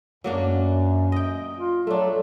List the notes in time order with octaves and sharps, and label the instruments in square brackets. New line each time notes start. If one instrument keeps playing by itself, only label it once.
[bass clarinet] F#2 [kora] F#3 A#3 D4
[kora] D#5 G5
[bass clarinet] F4
[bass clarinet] F#3 [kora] A3 D4 [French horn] A4